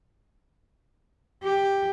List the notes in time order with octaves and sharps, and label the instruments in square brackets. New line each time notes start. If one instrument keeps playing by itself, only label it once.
[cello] G4